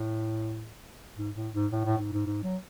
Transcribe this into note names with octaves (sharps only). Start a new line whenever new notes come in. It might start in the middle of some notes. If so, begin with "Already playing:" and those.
Already playing: A2
G#2
A2
G#2
A2
A2
G#2
G#2
G#2
F#3